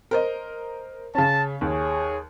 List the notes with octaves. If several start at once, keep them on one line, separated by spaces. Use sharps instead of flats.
A#4 C5 D#5
C#3 C#4 A5
D#2 G#4 C#5